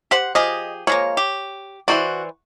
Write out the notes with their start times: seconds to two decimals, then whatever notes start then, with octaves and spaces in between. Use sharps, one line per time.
0.11 G4 C5 F#5
0.35 F3 G4 G#4 D#5
0.87 F3 G#3 A#3 C#5
1.17 G4
1.88 E3 F#4 C5 D5